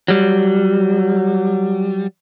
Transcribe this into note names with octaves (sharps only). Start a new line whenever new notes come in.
F#3 G3